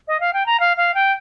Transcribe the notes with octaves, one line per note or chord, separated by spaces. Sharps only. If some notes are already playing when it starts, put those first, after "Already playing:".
D#5
F5
G5
A#5
F5
F5
G5